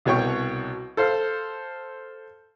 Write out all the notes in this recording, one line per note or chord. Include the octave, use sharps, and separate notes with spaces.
C2 B2 C#5 G5 C#6
A4 C5 F5